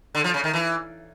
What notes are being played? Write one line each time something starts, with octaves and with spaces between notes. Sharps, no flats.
D3
F3
C#3
D#3
E3